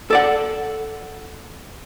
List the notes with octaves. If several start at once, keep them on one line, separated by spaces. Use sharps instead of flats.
A4 D5 F#5